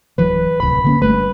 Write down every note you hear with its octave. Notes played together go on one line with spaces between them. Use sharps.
D1 E3 F#3 B4
D1 C2 B5
D3 A#3 C#4
G1 G2 A3 B4